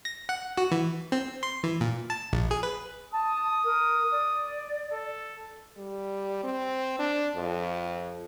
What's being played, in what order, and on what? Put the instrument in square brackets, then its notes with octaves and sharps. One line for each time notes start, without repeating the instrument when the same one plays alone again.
[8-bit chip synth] A#6
F#5
F#4
E3
C4
C6
E3
A#2
A5
A#1
G#4
B4
[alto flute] A5 [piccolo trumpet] D#6
[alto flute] A#4
D5
[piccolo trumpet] A4
[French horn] G3
C4
D4
F2